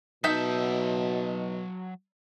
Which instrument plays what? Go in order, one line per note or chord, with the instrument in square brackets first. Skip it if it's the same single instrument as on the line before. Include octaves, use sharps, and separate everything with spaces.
[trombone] B2 [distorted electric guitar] F#3 A5 [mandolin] D#4 E5 G6